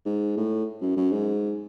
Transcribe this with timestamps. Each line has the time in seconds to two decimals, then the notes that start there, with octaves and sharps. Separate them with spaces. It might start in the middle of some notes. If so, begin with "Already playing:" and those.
0.06 G#2
0.37 A2
0.81 F#2
0.97 F#2
1.12 G#2